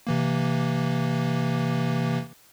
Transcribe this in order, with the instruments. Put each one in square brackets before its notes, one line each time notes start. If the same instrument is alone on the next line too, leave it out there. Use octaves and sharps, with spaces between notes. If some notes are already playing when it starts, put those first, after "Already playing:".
[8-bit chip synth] C3 E3 A#3